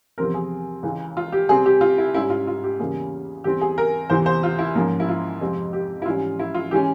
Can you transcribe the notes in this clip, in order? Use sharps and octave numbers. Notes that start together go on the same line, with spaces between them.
E2 C3 F3 C4 A#4
G#4
C#2 C#3 E3 G#3
F4
G4
C3 G3 C4 G#4
G4
F4
E4
G#2 G3 C#4 E4
F4
F4
G4
E2 C#3 G3 A#3 C#4 G#4
E2 E3 G3 C4 G4
G#4
A#4
E2 C3 E3 C5
C5
F4
E4
G#2 F3 A#3 C#4
E4
F4
F2 C3 F3 G#3 C4
G4
E4
G#2 E3 G3 C#4 F4
E4
F4
E3 G#3 C#4 G4